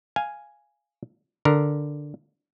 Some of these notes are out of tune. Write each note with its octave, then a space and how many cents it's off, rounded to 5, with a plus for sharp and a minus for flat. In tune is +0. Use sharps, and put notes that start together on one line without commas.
F5 +0 G#5 +0
D3 +0 A#4 +0